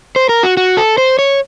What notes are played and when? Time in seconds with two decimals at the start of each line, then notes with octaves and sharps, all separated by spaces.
0.16 C5
0.29 A#4
0.43 F#4
0.57 F#4
0.77 A4
0.98 C5
1.19 C#5